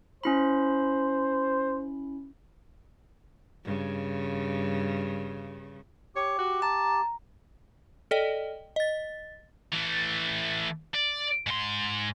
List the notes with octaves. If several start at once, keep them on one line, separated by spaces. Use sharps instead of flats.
C#4 E4 C5 B5
G2 C#3
G4 C#5
F#4
A5 A#5
A4 D5 D#5 G5
D#5 A6
E3 A3
D5
G#2 C6